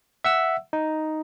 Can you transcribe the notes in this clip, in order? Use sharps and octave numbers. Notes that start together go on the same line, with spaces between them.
E5 F#5 E6
D#4